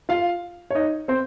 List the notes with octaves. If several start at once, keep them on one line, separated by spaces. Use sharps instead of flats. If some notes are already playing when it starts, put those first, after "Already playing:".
F4 F5
C#5
D#4 D#5
C4 C5